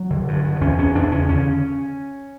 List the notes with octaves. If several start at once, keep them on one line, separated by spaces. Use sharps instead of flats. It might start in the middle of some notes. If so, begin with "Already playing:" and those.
Already playing: F#3
D3
G2
G2
E2 C#4
E2 C#4
E2 D4
C#3 C#4
D3 C#4